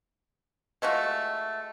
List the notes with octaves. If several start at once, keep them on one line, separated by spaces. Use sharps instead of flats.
G#3 A3 F4 F#4